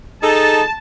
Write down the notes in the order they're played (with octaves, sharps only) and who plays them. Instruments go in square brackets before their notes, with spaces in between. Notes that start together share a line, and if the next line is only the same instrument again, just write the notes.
[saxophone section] D#4 G#4 A4 [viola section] A5